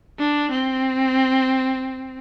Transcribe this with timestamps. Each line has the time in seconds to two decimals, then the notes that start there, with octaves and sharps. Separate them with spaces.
0.19 D4
0.51 C4